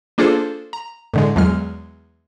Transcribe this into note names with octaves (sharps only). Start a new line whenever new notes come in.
A#3 D4 F4 G#4 A4 C5
A#5
A2 D3 G#3
E2 F#3 G#3 F6